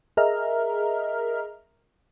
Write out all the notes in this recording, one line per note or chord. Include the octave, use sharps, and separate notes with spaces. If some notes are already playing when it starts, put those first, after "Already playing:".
G#4 A#4 D#5 E5 A#5 F6